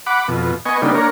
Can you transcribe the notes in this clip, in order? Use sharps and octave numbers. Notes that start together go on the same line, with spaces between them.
F#5 B5 D6
F2 B2
B3 D#5 G#5 C#6
C#3 G3 A#3 B3 D4 D#4
A#3 D4 A#4 C#5